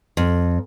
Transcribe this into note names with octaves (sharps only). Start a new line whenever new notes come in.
F2